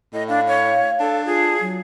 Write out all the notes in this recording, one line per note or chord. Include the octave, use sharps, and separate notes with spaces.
A2 D#5
D4 F5
C#5
D4 A4
F4 G#4
F#3